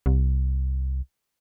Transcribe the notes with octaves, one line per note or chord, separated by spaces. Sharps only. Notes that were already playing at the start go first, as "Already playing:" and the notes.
C2